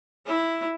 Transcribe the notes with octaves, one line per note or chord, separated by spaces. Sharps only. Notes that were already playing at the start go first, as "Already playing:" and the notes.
E4